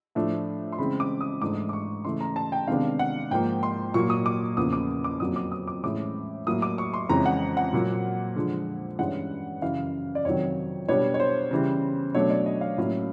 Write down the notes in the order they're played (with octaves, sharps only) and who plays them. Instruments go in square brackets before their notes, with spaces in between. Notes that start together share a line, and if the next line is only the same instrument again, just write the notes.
[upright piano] A2 F3 A3 D4
C6
C#3 E3 G#3 C4 B5
D6
D#6
G#2 E3 A3 D4 D6
D6
C#6
C#3 E3 A3 C6
A#5
A5
G5
C3 D#3 G#3 B3 D4 F5
F#5
G#2 F3 A#3 G5
C6
A#2 F#3 A#3 C#6
D#6
D6
E2 C#3 F3 A#3 D#6
D6
D6
F2 D3 F#3 A#3 D#6
D6
D#6
D6
A2 E3 G#3 C#4 D6
A2 F#3 A#3 D#6
D6
C#6
C6
F2 C#3 E3 G#3 C#4 A#5
F#5
F#5
A#2 F#3 A#3
D3 F3 G#3
G2 E3 G#3 C#4 F#5
F#2 C#3 E3 F5
D5
F2 C3 D#3 F#3 C#5
B2 G3 B3 D4 C#5
C#5
C5
C#3 E3 G3
B2 F#3 A3 D4 C#5
D5
D#5
F5
A2 F#3 A#3 C#4